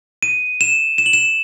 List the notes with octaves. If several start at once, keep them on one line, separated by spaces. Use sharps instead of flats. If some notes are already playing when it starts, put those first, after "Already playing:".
D#7
E7
E7
F#7
E7